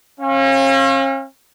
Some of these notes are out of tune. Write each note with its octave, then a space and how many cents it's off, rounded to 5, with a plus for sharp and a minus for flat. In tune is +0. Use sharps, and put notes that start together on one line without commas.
C#4 -40 F5 +0